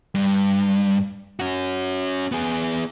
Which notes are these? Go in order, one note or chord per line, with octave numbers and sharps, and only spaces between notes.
G2
C#4 F#4
B3 G#4